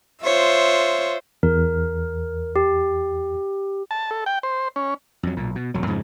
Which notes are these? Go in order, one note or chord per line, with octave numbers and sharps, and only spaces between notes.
F4 C5 C#5 E5
E2 A#4
G4
A5
A4
G5
C5
C#4
F2 F#3
B1 A#2
B2
E1 F#3
F2 G#2 C#3 F3